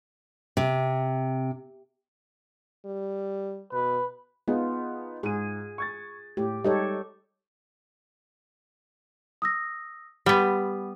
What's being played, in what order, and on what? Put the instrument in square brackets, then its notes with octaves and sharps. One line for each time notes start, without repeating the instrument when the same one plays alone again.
[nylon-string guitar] C3
[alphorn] G3
[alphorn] B2 [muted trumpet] B4
[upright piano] B3 D#4 G#4 [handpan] F4
[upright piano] G#2 D#7 [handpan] G#4
[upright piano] C#6 G#6 A6
[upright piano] A2 [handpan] G4
[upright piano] G3 G#3 D#4 [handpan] G4 A4 C#5
[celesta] D#6 E6 A#6
[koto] G3 B3 [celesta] G4 F#5